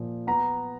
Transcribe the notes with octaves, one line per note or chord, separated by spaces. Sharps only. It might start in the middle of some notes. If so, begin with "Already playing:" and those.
Already playing: A#2 F3
B3 A#5